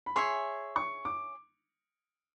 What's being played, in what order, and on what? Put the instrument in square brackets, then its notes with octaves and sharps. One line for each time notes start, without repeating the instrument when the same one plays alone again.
[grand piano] B5
[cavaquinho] G#4 C#5 E5 G#5 [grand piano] C6
[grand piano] C#6
D6